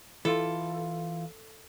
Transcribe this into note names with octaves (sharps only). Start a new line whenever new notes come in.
E3 E4 F4 A4